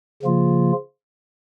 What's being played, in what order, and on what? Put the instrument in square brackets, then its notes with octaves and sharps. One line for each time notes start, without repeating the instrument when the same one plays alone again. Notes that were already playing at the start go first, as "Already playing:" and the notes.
[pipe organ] C#3 F3 A#3 F4